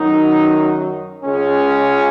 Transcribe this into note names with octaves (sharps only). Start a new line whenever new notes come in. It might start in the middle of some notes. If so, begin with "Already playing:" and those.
Already playing: F#2 D#3 F#3 D#4
C#2 C#3 G#3 C#4